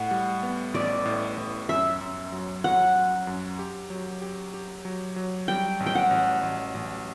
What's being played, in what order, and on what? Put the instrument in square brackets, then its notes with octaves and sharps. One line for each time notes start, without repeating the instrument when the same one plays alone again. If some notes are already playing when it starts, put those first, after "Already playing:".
Already playing: [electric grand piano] A2 [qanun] F#5
[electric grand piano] G3
B3
[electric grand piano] A1 [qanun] D5
[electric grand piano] A2
A2
[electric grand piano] F#2 [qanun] E5
[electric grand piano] F#2
F#3
[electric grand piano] F#3 [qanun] F#5
[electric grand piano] F#3
F#2
G4
F#3
G4
G4
F#3
F#3
[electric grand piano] G3 [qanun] G5
[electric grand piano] A1
[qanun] G5
F#5
[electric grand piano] A1
A1
A1